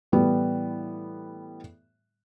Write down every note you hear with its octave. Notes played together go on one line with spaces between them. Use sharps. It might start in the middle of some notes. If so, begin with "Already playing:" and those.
A2 E3 G3 B3